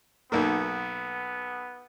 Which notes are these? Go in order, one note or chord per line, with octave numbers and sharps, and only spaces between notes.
B1 A#3 B3